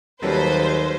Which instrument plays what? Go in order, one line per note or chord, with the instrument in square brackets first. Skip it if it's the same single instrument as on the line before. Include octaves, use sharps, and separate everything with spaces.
[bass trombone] D#2 [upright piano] F#3 G3 A4 [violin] B4 [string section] C5